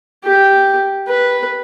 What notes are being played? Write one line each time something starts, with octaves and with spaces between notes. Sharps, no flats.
G4
B4